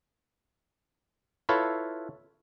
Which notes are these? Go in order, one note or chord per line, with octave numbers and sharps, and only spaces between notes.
E4 F4 A4 B4 C#5 F5